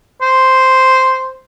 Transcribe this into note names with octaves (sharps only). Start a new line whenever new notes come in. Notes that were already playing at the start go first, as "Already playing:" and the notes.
C5